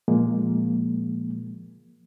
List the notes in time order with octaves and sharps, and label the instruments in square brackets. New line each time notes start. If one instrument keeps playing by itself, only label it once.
[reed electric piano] A#2 F3 G#3 A#3